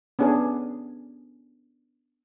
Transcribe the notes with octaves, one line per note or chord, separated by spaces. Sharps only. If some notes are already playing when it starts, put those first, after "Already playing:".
B3 C#4 D4 G#4